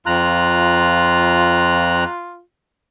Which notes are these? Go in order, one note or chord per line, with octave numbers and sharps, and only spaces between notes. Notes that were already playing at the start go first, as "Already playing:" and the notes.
F2 F4 A#5 F#6